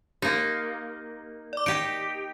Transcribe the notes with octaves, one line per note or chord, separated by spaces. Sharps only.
A#3 D#4 G4
D5 D6
D#4 G4 D7